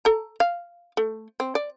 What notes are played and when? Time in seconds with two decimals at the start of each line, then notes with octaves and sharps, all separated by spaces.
0.05 A4 A#5
0.40 F5
0.97 A3
1.40 C4
1.55 D5